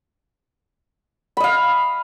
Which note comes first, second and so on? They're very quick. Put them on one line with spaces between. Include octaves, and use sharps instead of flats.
B5 D#5 F5